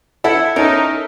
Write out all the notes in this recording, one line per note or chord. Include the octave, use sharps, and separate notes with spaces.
E4 A4 E5 F#5
C#4 D#4 A4 A#4